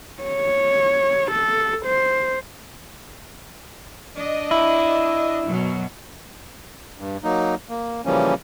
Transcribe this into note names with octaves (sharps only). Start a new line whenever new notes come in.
C#5
A4
C5
D4 D#5
E4
F#2 B2 F#3
G2
F#3 A#3 D#4
A#3
C#3 E3 F3 G3 A#3 C#4